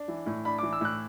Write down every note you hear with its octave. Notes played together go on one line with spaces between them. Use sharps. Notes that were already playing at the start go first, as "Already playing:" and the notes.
Already playing: D4
E3
A2
D4 B5
E3 D6
E6
A2 F#6